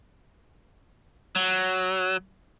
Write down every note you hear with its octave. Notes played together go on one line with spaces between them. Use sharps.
F#3